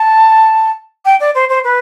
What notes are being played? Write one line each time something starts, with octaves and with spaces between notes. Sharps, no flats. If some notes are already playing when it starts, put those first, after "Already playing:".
Already playing: A5
G5
D5
C5
C5
B4